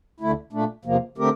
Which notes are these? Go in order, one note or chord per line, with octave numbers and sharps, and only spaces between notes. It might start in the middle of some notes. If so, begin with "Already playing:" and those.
D2 D3 A3 E4
A#2 A3 D4
E2 C3 F3 A#3
D3 A3 C4 G4 A#4